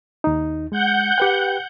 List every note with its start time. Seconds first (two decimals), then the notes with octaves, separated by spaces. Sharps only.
0.24 D#2 D#4
0.72 G#3 F#5 G6
1.18 G4 B4 G5